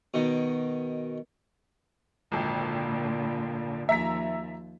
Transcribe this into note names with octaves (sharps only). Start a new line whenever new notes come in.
B2 D#3
G#1 F2 A#2 D3
D#2 F3 E5 A#5 B6